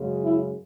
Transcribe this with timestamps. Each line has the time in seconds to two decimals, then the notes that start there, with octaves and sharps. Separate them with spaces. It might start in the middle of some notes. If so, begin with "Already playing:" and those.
Already playing: F#2 C#3 G#3
0.24 E4